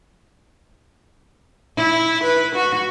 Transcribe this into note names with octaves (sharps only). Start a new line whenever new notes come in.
E4
B4
F#4